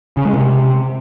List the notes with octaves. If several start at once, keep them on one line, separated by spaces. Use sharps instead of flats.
C#3
G#3
C3